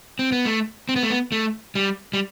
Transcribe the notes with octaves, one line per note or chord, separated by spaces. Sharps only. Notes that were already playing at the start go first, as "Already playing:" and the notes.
C4
B3
A3
C4
B3
A3
B3
A3
G3
G3